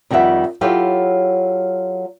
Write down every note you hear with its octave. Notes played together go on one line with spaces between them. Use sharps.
F2 D#3 G3 G4 E5 F#5
F#3 E4 F4 G4 A4 C#5